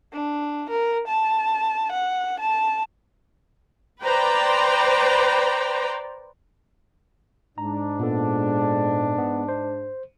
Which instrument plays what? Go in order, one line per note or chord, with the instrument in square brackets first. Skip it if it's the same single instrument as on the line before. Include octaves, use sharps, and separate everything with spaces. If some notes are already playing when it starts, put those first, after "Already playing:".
[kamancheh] D4
A#4
A5
F#5
A5
[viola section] B4 C5 D5 G5 A#5
[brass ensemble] G#2 D4 [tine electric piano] A#5
[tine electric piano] A#2 B3 A4
B3
C5